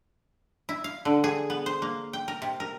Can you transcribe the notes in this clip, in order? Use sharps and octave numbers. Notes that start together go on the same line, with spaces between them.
E4
F5
D3
G#4
B3
C5
A#3
G5
A#4
C3
A#4